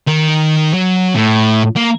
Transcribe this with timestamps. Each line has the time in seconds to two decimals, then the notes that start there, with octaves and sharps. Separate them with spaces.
0.07 D#3
0.73 F#3
1.15 A2
1.76 A#3